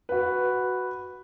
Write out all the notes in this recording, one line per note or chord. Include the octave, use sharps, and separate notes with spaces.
F#4 B4